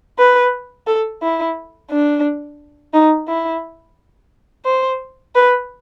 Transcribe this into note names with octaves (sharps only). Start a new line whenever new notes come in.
B4
A4
E4
D4
D#4
E4
C5
B4